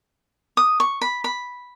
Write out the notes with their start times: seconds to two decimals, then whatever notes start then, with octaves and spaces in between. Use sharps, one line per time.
0.57 D#6
0.80 C#6
1.01 B5
1.24 B5